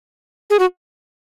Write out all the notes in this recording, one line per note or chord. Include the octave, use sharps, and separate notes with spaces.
G#4
F#4